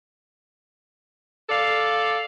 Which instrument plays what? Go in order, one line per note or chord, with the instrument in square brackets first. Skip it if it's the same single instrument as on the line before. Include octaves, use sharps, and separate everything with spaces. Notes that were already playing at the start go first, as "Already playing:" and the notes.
[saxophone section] A4 D5 F5